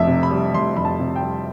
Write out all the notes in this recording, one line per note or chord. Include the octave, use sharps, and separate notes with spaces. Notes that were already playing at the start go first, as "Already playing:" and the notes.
Already playing: F1 F2 E5
C3
B5
G3
F1 C6
F2 B5
A5
C3
G5
G3